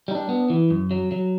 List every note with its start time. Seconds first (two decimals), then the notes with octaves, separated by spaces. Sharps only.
0.08 G3 D#4
0.15 D4
0.29 B3
0.50 E3
0.70 F#2
0.91 F#3
1.12 F#3